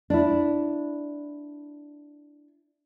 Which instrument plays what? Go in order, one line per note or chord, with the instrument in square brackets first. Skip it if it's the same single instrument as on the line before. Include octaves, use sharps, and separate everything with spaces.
[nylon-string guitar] D4 E4